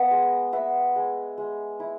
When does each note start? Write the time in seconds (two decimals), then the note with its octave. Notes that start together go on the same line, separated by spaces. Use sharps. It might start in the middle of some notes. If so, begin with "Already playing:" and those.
Already playing: B3 D#5
0.11 G#3
0.53 B3 E5
0.96 G#3
1.38 G#3
1.80 E4